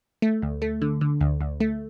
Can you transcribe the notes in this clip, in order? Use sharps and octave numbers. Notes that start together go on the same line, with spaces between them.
A3
D2
A3
D3
D3
D2
D2
A3